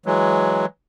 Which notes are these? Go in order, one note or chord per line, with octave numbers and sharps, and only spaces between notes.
E3 F#3 G#3